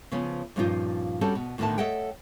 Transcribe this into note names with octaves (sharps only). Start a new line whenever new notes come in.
C#3 F3 B3 C#4
G2 A#2 F3 C#4 D#4 F4
G3 C4 C#4 F#4 A4
B2
D2 A2 D3 D#3 A3 A5
A4 C#5 D#5 E5 F#5 G5